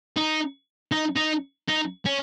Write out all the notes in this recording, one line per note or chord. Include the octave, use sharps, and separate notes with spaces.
D#4
D#4
D#4
D#4
C#4